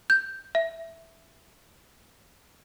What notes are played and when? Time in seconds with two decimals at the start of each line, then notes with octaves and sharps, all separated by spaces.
0.10 G6
0.55 E5